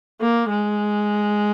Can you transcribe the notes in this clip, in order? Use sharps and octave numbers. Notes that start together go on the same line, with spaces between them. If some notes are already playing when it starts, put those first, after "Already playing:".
A#3
G#3